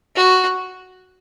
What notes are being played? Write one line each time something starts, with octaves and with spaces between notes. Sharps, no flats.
F#4